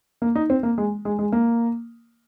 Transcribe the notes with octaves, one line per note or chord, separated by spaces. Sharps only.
A#3
D#4
C4
A#3
G#3
G#3
G#3
A#3